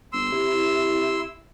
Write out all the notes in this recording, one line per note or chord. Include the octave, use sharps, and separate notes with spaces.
G1 C6 E6
C3 E4